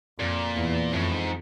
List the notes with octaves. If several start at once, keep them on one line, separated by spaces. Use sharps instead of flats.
F2 A#2
E2
F2 A2
G#2